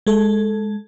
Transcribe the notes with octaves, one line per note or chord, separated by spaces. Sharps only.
G#3 A4